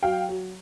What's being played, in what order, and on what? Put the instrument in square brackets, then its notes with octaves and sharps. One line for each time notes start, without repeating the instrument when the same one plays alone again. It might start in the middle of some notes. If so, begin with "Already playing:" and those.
[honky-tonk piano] F#3 F5 G5
F#3